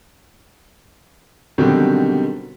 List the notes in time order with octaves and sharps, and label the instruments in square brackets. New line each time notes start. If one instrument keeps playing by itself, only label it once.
[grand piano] B2 D3 D#3 F#3 G3 C4